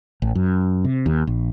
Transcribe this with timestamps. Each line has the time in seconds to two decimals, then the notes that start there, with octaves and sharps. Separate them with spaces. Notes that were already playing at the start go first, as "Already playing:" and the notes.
0.22 A1
0.35 F#2
0.85 C3
1.06 D#2
1.27 A#1